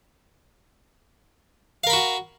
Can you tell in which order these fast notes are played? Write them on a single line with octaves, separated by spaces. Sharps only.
F5 A#4 B5 F#4